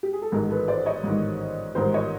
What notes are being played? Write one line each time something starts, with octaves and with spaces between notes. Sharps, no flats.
G4
G#4
A4
A1 G#2 D#3 G#4 A#4
A4 B4
C5 D5
C#5 D#5
A1 G#2 D#3
A1 G#2 D#3 A#4 C5
C#5 D#5